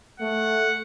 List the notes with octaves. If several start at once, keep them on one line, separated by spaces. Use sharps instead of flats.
A3 F#5